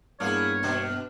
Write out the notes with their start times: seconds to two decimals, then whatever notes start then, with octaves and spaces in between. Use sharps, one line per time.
0.20 G2 A#3 B3 D4 E4 G#4 C#5 F6
0.63 B2 D4